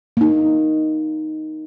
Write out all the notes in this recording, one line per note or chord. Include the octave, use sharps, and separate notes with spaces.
A#3 D#4